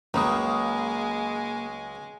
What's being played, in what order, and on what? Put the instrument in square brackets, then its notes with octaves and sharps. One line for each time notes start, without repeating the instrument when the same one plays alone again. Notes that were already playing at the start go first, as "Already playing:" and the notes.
[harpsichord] C#2 C#3 F#3 [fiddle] G#3 [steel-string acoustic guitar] A#3 [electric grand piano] A#5 B5 D#6